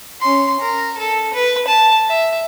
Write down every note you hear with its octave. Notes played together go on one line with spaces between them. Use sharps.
C#4 C6
A#4
A4
B4
A5
E5